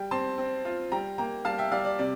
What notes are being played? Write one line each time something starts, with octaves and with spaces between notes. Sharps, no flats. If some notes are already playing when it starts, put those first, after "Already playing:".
Already playing: G3 G5
C4 A5 C6
C4
F4
G3 G5 A#5
A#3 G5 A#5
G3 F5 A5
E5 G5
G3 D5 F5
D5
C3 D5